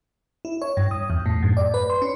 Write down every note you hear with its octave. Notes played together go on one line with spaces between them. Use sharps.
E4
C#5
G2
D#6
E2
A2
F#2
D5
B4
C6
C#4